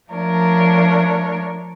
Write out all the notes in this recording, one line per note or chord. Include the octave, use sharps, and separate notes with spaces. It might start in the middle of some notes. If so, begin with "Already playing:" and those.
F3 A3 D4 A#4 C#5